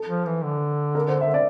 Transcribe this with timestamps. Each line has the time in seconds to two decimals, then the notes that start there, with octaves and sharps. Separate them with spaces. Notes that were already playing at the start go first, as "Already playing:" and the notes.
Already playing: A4
0.08 F3
0.26 E3
0.43 D3
0.95 A#4
1.08 C5
1.21 E5
1.34 D5